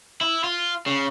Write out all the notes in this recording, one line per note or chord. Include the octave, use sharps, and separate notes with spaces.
E4
F4
C#3